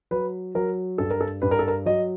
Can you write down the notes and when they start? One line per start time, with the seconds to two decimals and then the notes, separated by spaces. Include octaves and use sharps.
0.11 F#3 B4
0.55 F#3 A#4
0.98 G2 A4
1.10 A#4
1.21 A4
1.42 G2 B4
1.51 A#4
1.59 A4
1.68 A#4
1.86 F#3 D#5